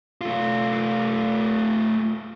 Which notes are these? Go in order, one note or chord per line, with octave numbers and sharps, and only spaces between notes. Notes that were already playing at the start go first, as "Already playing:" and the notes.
A3 F4